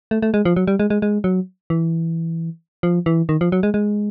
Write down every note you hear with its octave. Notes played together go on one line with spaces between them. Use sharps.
A3
A3
G#3
F3
F#3
G3
G#3
G#3
G#3
F#3
E3
F3
E3
D#3
F3
F#3
G#3
G#3